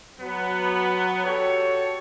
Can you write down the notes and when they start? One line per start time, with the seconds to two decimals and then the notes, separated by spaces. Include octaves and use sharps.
0.20 F#3 B3
1.26 F#4 G4 A4 C#5